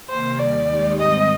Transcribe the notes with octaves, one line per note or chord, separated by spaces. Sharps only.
C3 D#3 A#3 C5
D#2 D#3 G3 D5
D#2 D#3 G#3 D#4 G4
G#2 D#3 G3 C4 D#5